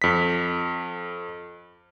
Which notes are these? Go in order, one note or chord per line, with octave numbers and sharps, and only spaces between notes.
F2 B6